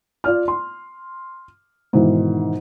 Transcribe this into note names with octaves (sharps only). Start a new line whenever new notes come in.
F4 D5 F6
C6
G#2 B2 D#3 E3